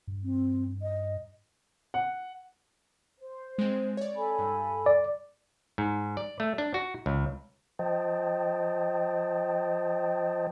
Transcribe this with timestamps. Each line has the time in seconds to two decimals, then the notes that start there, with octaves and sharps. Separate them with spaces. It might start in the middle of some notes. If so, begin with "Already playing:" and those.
0.07 G2
0.24 C4
0.82 D#5
1.94 F#5
3.19 C5
3.58 G#3 C4
3.97 C#5 D5
4.16 A4 G#5 B5
4.39 G2
4.86 D5
5.78 G#2
6.17 D5
6.40 A3
6.58 D4
6.74 F#4
7.06 C#2
7.79 F3 C5 D#5 G5 A5